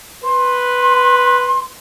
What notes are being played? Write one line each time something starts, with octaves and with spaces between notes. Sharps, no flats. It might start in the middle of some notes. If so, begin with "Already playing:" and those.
B4 C6